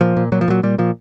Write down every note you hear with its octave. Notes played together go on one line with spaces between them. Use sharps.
A#2 F3
A#2
A#2 F#3
F3
A#2 F#3
A#2 G3
A#2 F3